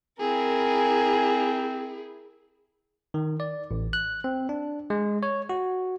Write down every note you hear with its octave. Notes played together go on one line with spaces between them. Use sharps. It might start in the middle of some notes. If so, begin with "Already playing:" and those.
C4 E4 G#4 A#4 G#5
D#3
D5
A1
F#6
C4
D4
G#3
C#5
F#4